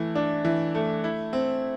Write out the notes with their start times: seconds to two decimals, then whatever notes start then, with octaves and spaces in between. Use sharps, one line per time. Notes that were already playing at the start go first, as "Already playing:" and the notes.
Already playing: E3 A3
0.15 D4
0.45 E3
0.75 A3
1.04 E4
1.33 C4